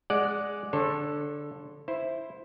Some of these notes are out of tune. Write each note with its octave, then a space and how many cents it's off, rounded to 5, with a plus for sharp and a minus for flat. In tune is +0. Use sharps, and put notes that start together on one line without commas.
G#3 +0 D5 +0 F#5 +0
D3 +0 A4 +0 C#5 -35
E4 +0 C5 +5